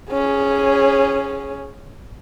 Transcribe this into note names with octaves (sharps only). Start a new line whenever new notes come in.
C#4 G#4